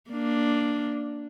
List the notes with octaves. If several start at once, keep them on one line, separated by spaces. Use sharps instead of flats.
A#3 D4